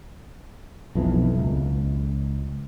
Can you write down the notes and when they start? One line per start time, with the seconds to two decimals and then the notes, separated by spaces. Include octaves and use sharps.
0.95 B1 F2 E3
1.39 C#2